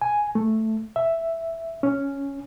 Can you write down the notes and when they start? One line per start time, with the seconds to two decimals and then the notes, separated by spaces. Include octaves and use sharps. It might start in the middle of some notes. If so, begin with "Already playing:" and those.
0.01 G#5
0.35 A3
0.96 E5
1.83 C#4